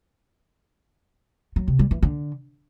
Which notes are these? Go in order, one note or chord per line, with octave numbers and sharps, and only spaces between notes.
F#3
C3
G3
E3
D3